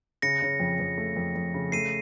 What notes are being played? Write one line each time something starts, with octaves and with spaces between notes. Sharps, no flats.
C#3 A#6 C#7
C#3
F2
F2
A3
F2
F2
C#3
A3 C7 D#7